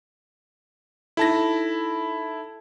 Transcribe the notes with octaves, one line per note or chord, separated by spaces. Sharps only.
D#4 E4 A4 A5 A#6